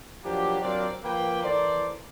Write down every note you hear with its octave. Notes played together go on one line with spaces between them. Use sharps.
F3 F#3 A#3 D4 G4
F#3 C4 D4 F4 A#4 D5
F3 A#3 B4 G5
E3 A4 A#4 C5 D5